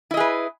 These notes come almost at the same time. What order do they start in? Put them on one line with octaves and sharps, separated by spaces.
E4 D#5 G#4 B4